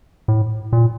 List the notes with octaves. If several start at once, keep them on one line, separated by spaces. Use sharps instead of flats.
A2
A#2